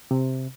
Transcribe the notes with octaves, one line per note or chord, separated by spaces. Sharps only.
C3